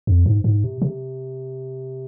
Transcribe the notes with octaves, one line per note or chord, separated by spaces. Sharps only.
F2
G#2
G#2
C3
C3